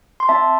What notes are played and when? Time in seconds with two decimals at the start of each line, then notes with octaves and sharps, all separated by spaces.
0.20 C6
0.29 C4 E5 A5